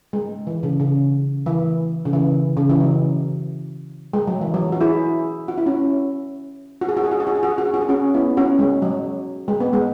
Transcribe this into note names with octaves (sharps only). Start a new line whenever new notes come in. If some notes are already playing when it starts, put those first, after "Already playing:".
G#3
E3
C#3
C#3
E3
C#3
E3
C#3
E3
F#3
G#3
F#3
E3
F#3
F#4
E4 G#4
F#4
E4
C#4 F#4
F#4
G#4
F#4
G#4
F#4
G#4
F#4
G#4
F#4
G#4
F#4
G#4
F#4
G#4
C#4 F#4
B3 E4
C#4 F#4
G#3
F#3
G#3
B3
G#3